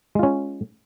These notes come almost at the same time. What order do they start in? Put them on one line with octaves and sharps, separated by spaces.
G#3 F4 C#4